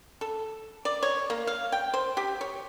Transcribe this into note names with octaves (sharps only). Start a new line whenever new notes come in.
A4
D5
C#5
A#3
F5
G5
C5
G4
C#5